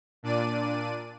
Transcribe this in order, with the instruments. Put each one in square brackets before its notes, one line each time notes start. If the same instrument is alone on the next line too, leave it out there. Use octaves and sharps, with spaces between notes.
[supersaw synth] A#2 D4 D5 D#7